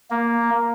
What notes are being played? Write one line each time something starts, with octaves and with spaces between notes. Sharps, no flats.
A#3